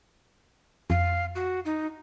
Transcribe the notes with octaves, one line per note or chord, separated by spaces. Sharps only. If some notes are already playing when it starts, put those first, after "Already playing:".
F2 F5
F#4
D#4